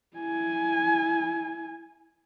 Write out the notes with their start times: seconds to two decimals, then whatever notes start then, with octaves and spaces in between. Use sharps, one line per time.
0.17 E4 G#5